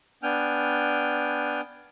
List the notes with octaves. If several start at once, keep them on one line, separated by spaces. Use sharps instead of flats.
B3 D4 G5 G#5 F6